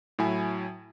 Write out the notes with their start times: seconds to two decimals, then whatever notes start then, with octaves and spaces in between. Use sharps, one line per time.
0.19 A2 F#3 E4 G#5